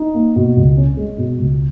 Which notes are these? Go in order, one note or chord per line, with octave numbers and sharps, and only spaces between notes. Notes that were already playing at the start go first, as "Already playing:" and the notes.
Already playing: D#4
A#3
B2
C#2
C#4
G#3
B2
C#2